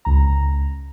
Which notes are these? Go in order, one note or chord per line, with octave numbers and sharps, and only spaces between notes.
C#2 A#5